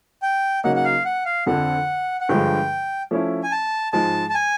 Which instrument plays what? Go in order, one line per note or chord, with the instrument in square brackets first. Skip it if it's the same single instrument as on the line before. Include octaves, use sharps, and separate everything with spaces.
[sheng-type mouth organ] G5
[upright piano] C#3 F#3 A#3 D#4 [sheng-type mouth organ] F#5
[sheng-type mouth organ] F#5
F5
F#5
F5
[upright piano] F2 D3 F3 [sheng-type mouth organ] F#5
[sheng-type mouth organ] F#5
[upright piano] G2 D3 F3 G#3 [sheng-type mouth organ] G5
[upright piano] F3 A3 C#4 E4
[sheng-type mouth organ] G#5
A5
[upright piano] G#2 F3 G#3 [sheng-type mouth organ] A5
[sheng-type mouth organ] A5
G#5